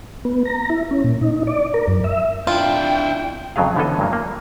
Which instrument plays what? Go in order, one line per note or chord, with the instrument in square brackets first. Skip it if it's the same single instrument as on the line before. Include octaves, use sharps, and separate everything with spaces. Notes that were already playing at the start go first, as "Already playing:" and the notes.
[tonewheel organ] B3
A#5
E4
C#4
A#2
D#4
D5
A#4
F#2
E5
[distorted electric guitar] D4 E4 [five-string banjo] F4 [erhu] G5
[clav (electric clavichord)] F2 C#3 F#3 A3 G#4 F5
D3 E3 B3 C#4 A4 D#5
G2 F#3 A#3
A#3